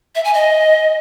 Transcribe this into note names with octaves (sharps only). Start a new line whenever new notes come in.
E5
G#5
D#5